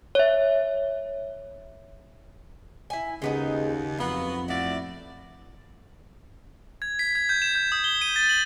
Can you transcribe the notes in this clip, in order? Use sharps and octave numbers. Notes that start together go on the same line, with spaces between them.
C#5 E5
E4 G#5
D#2 C#3 G#3 B3 D#4
F2 F#3 B3 F4 F#4
A2 E4 F#4 D5
G#6
B6
G#6
G6
E7
G6
D#6
G7
D#7
A6
F#7